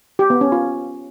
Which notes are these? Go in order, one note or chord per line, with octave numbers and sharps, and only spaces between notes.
G4
B3
C#4
F4